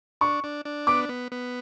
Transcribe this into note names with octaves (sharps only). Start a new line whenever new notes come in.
D4 C#6
D4
D4
B3 D6
B3
B3